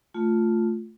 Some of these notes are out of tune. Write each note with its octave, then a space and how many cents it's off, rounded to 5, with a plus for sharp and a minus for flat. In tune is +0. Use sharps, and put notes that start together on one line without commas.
A3 +0 F4 +0